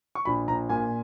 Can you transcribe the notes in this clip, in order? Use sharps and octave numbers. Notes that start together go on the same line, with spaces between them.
C#6
A#1 B5
A#1 A#5
A#2 G#5